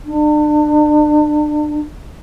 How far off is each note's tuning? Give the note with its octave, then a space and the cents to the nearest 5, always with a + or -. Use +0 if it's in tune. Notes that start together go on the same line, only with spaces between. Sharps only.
D4 +35